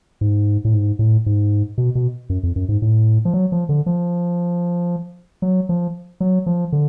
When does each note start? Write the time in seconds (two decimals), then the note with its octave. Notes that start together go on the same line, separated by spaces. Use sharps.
0.21 G#2
0.65 A2
0.74 G#2
0.99 A2
1.26 G#2
1.78 B2
1.95 B2
2.30 F#2
2.43 F2
2.56 F#2
2.69 G#2
2.82 A2
3.25 F3
3.34 F#3
3.52 F3
3.69 D3
3.86 F3
5.42 F#3
5.69 F3
6.20 F#3
6.46 F3
6.72 D3